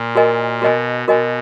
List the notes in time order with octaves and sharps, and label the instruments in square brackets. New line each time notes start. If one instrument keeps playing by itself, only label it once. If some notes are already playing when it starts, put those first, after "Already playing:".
Already playing: [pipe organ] A#2
[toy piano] F#4 A#4 D#5 G#5
[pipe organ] B2 [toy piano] F#4 A#4 D#5 G#5
[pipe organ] B2 [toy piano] F#4 A#4 D#5 G#5